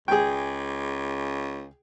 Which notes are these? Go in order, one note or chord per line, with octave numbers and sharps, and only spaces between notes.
C#2 G#4 G5